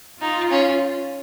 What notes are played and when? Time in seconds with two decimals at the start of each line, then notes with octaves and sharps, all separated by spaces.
0.21 D#4 F4
0.50 C#4